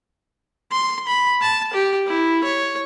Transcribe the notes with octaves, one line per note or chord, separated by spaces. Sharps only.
C6
B5
A5
G4
E4
C#5